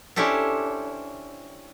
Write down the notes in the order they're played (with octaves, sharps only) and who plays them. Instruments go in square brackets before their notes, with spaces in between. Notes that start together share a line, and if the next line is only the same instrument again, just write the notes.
[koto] C#4 D4 E4 G4 A4 C5